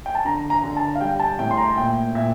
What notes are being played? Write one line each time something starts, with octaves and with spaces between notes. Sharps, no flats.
G5
A5
D3 A#5
A#5
D3
A5
F5
G3 G5
A5
A2 G5
C6
A#5
A#2 G5
A#2 E5